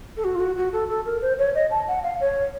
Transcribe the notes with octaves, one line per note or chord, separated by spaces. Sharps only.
A4
F#4
F4
F#4
F#4
A4
A4
A#4
C5
C#5
D#5
A5
F#5
F5
C#5